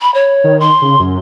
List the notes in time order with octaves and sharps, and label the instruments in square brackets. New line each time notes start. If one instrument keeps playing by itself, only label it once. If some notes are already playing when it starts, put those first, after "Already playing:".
[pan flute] B5
C#5
[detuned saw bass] D#3
[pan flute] C6
[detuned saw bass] C#3
F#2